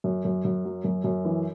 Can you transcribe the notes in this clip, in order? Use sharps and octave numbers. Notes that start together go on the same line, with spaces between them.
F#2
F#2
F#2
F#3
F#2
F#2
E3